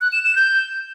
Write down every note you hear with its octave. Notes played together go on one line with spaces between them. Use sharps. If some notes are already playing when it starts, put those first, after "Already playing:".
F#6
E7
E7
G6